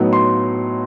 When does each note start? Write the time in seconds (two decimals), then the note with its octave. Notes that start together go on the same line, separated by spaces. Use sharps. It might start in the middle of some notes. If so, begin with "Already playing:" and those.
Already playing: A2 F#3 B3 D#4
0.13 C6